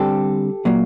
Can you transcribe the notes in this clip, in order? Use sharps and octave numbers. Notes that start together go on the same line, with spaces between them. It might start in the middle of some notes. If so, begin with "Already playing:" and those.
Already playing: D3 G3 C4 G4 A4
A#2 F#3 A#3